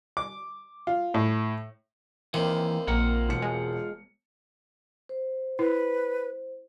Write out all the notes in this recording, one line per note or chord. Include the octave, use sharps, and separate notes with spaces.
D6
F4
A2
D#2 C3 E3 A#3
A#1 A#3 F4 F#5
E1 C#7
G#3
C5
E4 B4